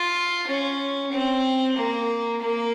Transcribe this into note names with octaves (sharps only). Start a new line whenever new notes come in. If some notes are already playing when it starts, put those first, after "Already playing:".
Already playing: F4
C#4
C4
A#3
A#3